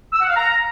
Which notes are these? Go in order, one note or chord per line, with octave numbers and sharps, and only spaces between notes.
E6
F#5
F5
A#5